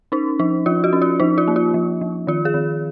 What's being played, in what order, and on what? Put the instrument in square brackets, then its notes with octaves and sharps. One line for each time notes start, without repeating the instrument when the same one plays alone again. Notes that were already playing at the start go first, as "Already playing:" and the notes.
[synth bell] C#4 D#4
F3 D#4
F3 F4
F#4
C#4
F4
F3 D#4
F4
A#3
F4
F3
F3
D#3 F4
G#4
D#3